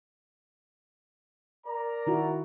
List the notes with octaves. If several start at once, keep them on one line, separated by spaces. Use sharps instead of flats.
A#4 D5 A#5
D#3 E4 F#4